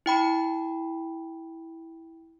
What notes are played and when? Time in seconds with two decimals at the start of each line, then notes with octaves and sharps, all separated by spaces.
0.06 E4 G5 B5